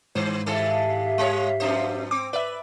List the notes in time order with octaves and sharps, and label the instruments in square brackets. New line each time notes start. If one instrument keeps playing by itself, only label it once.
[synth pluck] G#2 [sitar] D#3 C5
[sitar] D#3 G#3 A4 [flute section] G4 E5 F5
[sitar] G3 C#5
F2 D4 C5
[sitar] C4 [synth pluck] D6
[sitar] B4 [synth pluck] D5 E5